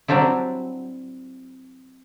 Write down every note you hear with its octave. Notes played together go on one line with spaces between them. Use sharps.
F#3 G3 C4 D4 E4